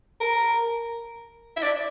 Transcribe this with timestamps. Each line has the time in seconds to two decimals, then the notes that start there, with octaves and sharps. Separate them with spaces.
0.20 A#4
1.56 E5
1.62 D5